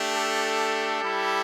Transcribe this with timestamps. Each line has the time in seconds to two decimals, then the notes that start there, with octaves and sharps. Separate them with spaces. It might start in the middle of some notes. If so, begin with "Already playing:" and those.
Already playing: A3 D4 G4
0.14 A4
1.00 G3 E4 G4